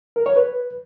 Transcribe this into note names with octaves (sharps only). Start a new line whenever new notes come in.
A#4
C#5
B4